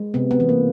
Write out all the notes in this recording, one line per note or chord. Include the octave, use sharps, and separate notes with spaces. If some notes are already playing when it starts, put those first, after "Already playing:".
Already playing: G#3
C3 B3
B3
E3
A#3